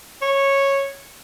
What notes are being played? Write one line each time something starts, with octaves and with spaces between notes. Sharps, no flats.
C#5